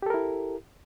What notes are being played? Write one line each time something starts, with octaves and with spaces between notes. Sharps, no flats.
E4 G4 A4 A#4